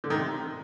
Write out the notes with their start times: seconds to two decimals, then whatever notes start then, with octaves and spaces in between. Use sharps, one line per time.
0.04 D3
0.10 D#3
0.17 C3